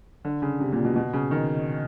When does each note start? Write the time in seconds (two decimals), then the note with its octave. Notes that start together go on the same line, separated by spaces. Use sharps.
0.25 D3
0.42 C#3
0.60 C3
0.72 A#2
0.85 B2
0.96 B2
1.13 C#3
1.31 D#3